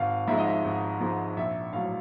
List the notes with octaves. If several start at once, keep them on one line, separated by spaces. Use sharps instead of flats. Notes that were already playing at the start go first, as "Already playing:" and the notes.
Already playing: G#1 F5
G#2 F3 G#3 E5
D#5
E5
G#1
G#2 F3 G#3
A#1 E5
A2 F#3 F5